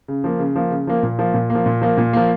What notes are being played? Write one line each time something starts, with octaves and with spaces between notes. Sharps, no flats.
C#3
F3 A#3
C#3
F3 A#3
C#3
F3 A#3
A#2
F3 A#3
A#2
F3 A#3
A#2
F3 A#3
A#2
F3 A#3